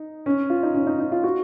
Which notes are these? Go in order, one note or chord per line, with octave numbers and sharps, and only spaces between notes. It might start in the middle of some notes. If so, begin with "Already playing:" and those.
Already playing: D#4
C#4
F4
D#4
C#4
D#4
D#4
F4
F#4